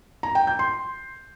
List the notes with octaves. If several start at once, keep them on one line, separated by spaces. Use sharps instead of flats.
A#5
G5
G6
C6